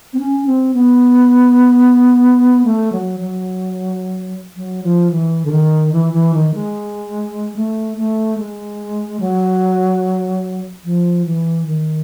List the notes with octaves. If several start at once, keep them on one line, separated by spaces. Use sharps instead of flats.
C4
C#4
C4
B3
A3
F#3
F#3
F#3
F3
E3
D3
D#3
E3
E3
D#3
G#3
A3
A3
G#3
F#3
F3
E3
D#3